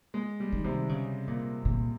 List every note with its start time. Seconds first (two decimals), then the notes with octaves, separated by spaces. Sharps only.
0.14 G#3
0.40 G3
0.52 D#3
0.64 C3
0.89 C#3
1.27 A#2
1.65 A#2